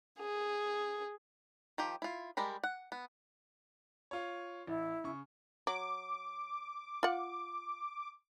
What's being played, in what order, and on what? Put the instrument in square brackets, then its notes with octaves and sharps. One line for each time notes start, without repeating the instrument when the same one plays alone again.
[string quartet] G#4
[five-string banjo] D#3 F3 G4
E4 F4
G3 G#3 G4 A#4 B5
F#5
B3
[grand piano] F4 C#5
[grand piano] A1 [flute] E4
[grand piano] C#3 C#6
[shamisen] F#3 [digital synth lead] D6
[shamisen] F4 F#5